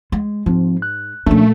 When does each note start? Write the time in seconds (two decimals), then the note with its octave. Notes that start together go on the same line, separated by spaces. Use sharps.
0.12 G#3
0.46 G#2 F3 C4
0.82 F#6
1.26 A#2 F3 A3 A#3 C#4 D4